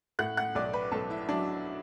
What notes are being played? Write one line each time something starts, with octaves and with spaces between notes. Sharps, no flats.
A2 F#5 F#6
F#5 F#6
B1 D5 D6
B4 B5
B1 A4 A5
E4 E5
F#3 D4 D5